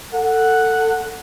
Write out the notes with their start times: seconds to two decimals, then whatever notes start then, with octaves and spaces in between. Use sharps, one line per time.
0.14 A4 F#5